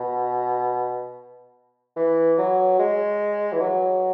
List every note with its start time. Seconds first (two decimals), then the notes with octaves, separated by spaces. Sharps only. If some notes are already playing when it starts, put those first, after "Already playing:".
Already playing: B2
1.96 E3
2.38 F#3
2.79 G#3
3.52 E3
3.60 F#3